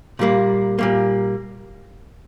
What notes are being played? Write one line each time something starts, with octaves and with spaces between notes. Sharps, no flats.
A#2 G3 A#3
A#2 G3 A#3